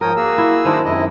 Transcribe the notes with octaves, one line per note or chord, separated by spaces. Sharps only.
G#2 F3 A#4 C#5 G5 D#6
A#3 F#4 G#4 E6
E4
D#3 G#3 D4 E4 C5
F#2 C3 E4 D#5